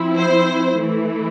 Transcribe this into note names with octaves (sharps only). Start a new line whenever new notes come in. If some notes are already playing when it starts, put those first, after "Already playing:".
Already playing: F3 C4 E4
C5
E3 A3 E4